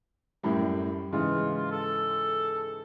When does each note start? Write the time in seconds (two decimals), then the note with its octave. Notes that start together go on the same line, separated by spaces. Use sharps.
0.43 F#2 A2 G3
1.13 G#2 C#3 E3 F4
1.56 F4
1.72 A4